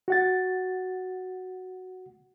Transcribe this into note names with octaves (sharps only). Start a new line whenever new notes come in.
F#4 F#5 A6